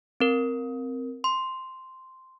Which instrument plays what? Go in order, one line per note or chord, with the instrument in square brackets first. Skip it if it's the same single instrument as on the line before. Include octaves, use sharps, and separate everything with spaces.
[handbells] C4 A#4
C6